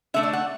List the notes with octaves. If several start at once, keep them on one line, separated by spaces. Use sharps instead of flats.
D3 A3 D4 E5
D5
F#5